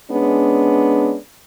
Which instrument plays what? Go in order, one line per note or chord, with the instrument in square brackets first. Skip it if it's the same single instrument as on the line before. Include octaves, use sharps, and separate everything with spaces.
[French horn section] G#3 B3 C#4 D4